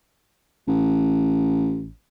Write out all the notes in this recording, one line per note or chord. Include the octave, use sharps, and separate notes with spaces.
A1